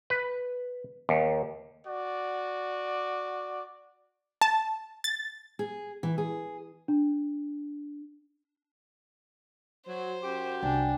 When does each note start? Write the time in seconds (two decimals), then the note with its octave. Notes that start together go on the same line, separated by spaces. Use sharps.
0.10 B4
1.09 D#2
1.86 F#4 D5
4.41 A5
5.04 A6
5.59 G#4
6.03 E3
6.18 G#4
6.88 D4
9.87 F#3 C5
10.23 F#2 F#4 G4
10.63 C2 D4 G5 G#5